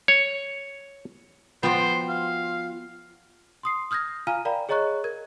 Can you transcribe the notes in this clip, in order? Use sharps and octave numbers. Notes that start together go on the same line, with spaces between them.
C#5
F3 B3 F4 F#4 C5 G5
F5
C6 D#6 C7
D#6 F6 G6 G#6 A#6
F4 F5 G#5 A#5 F6 D#7
A#4 D5 F5 G5 A#5 B5
G#4 C#5 D#5 A#5 C#6 F#6
A#4 G#6